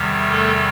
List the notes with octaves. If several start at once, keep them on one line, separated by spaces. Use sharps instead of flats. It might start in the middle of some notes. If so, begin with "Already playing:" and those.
Already playing: E2 C3 D#3 G3
A3 A4